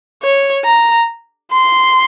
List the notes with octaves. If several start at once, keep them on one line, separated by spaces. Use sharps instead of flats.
C#5
A#5
C6